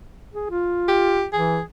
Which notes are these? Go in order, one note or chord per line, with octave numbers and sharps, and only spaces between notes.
G#4
F4
G4
E3 G#4